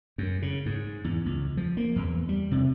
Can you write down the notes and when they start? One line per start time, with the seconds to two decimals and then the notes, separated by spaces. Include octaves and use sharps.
0.18 F#2
0.42 C#3
0.66 G#2
1.04 E2
1.26 C#2
1.57 F3
1.77 A#3
1.96 E2
2.29 G3
2.51 C3